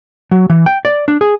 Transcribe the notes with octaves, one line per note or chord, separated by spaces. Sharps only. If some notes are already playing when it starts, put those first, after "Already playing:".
F#3
E3
G5
D5
D4
G#4